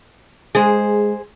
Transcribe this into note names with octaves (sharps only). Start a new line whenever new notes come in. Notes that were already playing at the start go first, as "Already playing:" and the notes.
G#3 G#4 C5